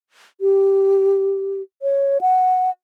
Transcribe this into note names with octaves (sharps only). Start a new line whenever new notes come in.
G4
C#5
F#5